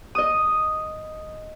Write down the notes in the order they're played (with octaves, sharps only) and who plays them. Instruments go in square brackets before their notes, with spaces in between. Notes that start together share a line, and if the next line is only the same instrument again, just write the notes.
[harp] D#5 D#6